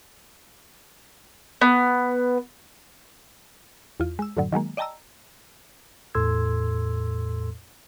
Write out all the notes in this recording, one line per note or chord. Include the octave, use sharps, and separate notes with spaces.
B3
E2 F4
G#3 E6
F#2 A2 D3 F#3
D#3 F#3 G#3 A#3
D5 D#5 G5 A5 A#5 E6
E2 A2 A4 C6 E6 G#6